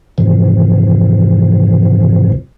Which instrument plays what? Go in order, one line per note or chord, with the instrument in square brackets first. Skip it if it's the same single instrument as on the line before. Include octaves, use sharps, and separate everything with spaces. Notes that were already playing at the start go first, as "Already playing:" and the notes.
[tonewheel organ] F2 G#2 C3 E3 F3